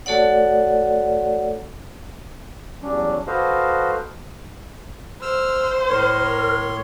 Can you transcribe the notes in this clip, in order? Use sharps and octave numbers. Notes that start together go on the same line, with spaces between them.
A3 F#4 A4 C#5 D5 F#5
E2 F#3 G3 C#4 D4
F#4 A4 B4 C5 D#5 F5
C5 E6 F6
A2 A#4 C#5 C6